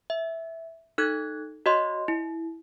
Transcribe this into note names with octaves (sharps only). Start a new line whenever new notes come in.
E5
D#4 A4 F#6 G#6
F#4 C#5 D#5 C6
E4